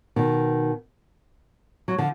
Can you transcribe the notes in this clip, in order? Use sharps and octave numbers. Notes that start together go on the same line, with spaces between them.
B2 D#3
F#3
D3 F3